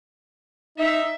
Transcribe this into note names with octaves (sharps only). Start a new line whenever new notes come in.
D#4 E5